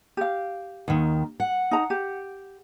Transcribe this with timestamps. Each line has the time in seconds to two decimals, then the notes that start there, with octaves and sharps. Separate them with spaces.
0.17 G4 F5
0.88 D#2 D#3
1.40 F#5
1.71 D#4 A#5
1.90 G4